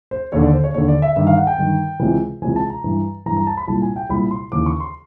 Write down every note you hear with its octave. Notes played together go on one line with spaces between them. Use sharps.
C5
D#2 D3 C#5
D5
C5
C#5
D#2 D3 C#5
D5
E5
G2 D#3 E5
F5
F#5
G5
G2 D#3
C#2 C3 E3
C#2 C3 E3 G#5
A5
A#5
G2 E3
G2 E3 A#5
A#5
A5
B5
C2 A#2 A5
G#5
G5
C2 A#2 B5
C6
D#2 C#3 E3 D6
C#6
C6